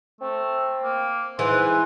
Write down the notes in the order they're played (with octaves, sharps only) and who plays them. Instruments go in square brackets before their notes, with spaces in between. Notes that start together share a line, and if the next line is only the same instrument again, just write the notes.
[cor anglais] A3 [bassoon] C4
[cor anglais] A#3
[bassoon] G#2 [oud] E3 [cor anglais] C5 [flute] G#5